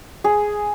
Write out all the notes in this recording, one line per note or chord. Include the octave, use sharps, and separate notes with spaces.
G#4